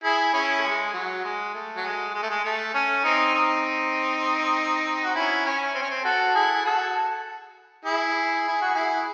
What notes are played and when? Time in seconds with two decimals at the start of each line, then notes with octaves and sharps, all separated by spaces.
0.04 E4 G#4
0.34 C#4 E4
0.58 A3
0.64 G#3
0.94 F#3
1.24 G#3
1.54 A3
1.77 F#3
1.84 G#3
2.14 G#3
2.22 A3
2.30 G#3
2.44 A3
2.74 C#4
3.04 C4 D#4
3.34 C4 D#4
5.04 F#4
5.14 C#4 E4
5.45 C#4
5.75 C4
5.82 C#4
5.90 C4
6.04 F#4 A4
6.35 E4 G#4
6.55 G#4
6.65 F#4 A4
7.85 E4 G#4
8.48 E4
8.61 F#4
8.75 E4 G#4